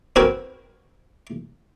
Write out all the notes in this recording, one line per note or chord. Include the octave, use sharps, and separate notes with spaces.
C4 F#4 A#4 B4 G#5